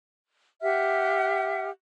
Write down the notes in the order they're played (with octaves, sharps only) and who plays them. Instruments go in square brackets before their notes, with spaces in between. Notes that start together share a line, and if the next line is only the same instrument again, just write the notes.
[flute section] G4 E5 F#5 F6